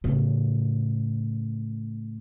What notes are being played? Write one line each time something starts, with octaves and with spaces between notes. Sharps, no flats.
A2 C#3